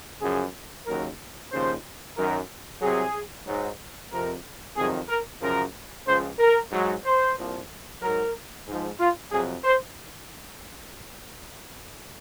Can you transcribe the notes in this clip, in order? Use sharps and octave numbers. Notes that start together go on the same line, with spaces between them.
F#2 C#3 F3 G#4
D#2 C#3 F#3 A#4
D#2 C#3 F3 C5
F#2 D#3 F#3 A#4
C2 C3 F#3 G#4
G#2 F#3
F2 C3 F3 A#4
F2 C3 D#3 F#3 G#4
A#4
F#2 C#3 F3 A#4
C#2 C#3 F3 C5
A#4
G#2 F#3
C5
C2 A#2 F3
G#2 F#3 A#4
G#2 F3
F4
F2 C3 F#3 G#4
C5